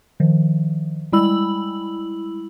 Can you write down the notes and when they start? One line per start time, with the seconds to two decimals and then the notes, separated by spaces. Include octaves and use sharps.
0.20 D#3 F3
1.12 G3 G#3 E4 B5 E6 F#7